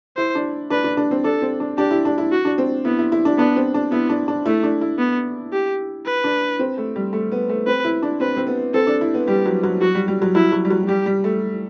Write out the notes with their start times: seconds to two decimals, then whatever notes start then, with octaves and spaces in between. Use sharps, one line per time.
0.17 E4 C5
0.35 D4
0.70 D4 B4
0.84 D4
0.97 D4
1.11 C4
1.24 D4 A4
1.42 C4
1.60 D4
1.78 D4 G4
1.91 E4
2.05 D4
2.18 E4
2.32 F#4
2.45 D4
2.58 C4
2.85 B3 E4
2.99 E4
3.12 E4
3.25 D4
3.38 B3 D4
3.56 C4
3.74 D4
3.92 B3 E4
4.09 D4
4.28 D4
4.46 A3 E4
4.63 D4
4.81 E4
4.99 B3
5.53 G4
6.06 B4
6.24 D4
6.59 C4
6.78 A3
6.96 G3
7.13 A3
7.32 B3
7.49 A3
7.67 C4 B4
7.84 E4
8.03 D4
8.20 C4 B4
8.37 C4
8.47 B3
8.74 C4 A4
8.87 D4
9.01 E4
9.14 B3
9.28 G3 G4
9.46 F#3
9.63 F#3
9.81 F#3 F#4
9.95 G3
10.08 G3
10.22 F#3
10.35 F#3 E4
10.52 F#3
10.65 G3
10.70 F#3
10.84 F#3
10.88 G3 G4
11.06 G3
11.24 A3